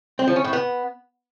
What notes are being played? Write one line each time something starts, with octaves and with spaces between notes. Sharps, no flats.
C4
F3
C#4
A2
B3